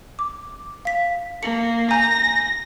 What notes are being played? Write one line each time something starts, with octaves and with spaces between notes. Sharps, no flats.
D6
F5 B6
A#3 C#7
G#5 A#5 G6 A#6